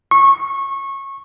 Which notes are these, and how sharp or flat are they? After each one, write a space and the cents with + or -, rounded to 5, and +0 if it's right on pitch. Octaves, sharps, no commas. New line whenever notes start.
C#6 -20